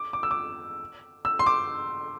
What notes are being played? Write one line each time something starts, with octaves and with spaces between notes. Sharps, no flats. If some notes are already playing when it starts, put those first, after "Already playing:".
Already playing: D6
D6
E6
D6
E6
C6
D6